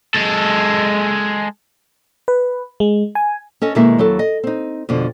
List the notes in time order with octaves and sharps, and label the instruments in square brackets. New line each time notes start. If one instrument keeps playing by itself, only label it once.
[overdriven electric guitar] G#3 A4
[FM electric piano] B4
G#3
G#5
[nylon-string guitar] C#4 A4 D#5
B2 D#3 G#3 A#3 E4 E5
D#2 F#3 E4 A4
D#5
C4 D#4
F2 B2 D3